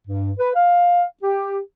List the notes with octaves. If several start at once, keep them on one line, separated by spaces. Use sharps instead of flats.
G2
B4
F5
G4